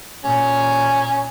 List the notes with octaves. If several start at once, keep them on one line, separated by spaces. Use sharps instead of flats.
A#2 C#4